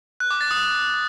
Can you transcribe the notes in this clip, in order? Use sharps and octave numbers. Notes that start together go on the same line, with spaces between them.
F#6
D6
A6
D#6